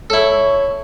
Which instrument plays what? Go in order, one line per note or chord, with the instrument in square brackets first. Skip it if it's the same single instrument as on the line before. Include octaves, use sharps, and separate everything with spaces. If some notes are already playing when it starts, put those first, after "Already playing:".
[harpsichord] E4 A4 [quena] C#5